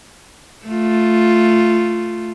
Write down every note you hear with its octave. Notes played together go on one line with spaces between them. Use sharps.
A3 F4